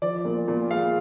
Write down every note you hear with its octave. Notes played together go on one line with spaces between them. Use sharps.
F3 D5
A#2
A#2
G#3 F5